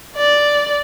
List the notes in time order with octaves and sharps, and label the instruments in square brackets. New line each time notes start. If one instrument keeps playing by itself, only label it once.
[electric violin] D5